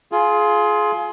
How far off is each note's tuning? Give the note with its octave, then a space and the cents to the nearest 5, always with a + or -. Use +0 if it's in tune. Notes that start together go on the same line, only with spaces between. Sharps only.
F4 +0 G#4 +25